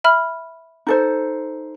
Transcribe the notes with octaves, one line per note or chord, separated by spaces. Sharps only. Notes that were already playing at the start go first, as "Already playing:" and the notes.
E5 B5 F6
D#4 A4 C5